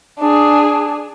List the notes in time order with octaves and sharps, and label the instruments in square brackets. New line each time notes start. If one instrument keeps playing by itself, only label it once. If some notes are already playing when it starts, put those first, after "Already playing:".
[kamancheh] D4 G#4